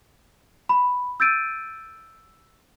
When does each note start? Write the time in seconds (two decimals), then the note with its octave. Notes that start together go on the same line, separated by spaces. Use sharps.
0.69 B5
1.20 E6 G6 A6 D7 D#7